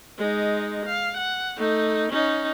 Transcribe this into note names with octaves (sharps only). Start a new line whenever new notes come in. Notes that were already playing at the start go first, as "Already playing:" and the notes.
G#3 D#4
F5
F#5
A3 D#4
C#4 D#4